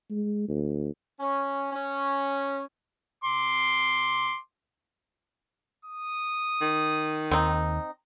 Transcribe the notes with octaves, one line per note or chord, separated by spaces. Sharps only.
G#3
D2
C#4
C#4
C6 D6
D#6
D#3
D#2 C4 D#4